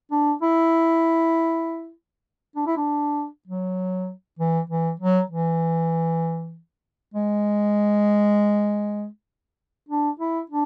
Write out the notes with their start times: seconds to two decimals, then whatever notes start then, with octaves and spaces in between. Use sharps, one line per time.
0.11 D4
0.42 E4
2.56 D4
2.66 E4
2.77 D4
3.47 F#3
4.39 E3
4.70 E3
5.00 F#3
5.30 E3
7.14 G#3
9.88 D4
10.19 E4
10.50 D4